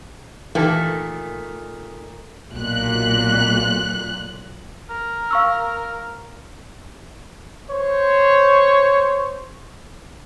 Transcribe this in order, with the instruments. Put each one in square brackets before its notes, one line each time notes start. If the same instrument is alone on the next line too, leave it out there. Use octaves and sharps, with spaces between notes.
[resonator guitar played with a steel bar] A#2 D#3 A3 [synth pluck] E3 G4 A4
[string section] B1 A#2 F#6
[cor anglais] A#4
[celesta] F5 C#6 E6
[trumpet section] C5 C#5